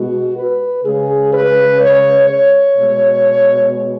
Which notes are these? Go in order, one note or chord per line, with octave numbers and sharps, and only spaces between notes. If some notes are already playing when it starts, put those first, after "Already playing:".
Already playing: B2 G#3 F#4
B4
C#3 G#3 G#4
B4
C#5
C#5
B2 G#3